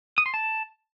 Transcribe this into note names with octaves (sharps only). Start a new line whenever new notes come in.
D#6
C6
A5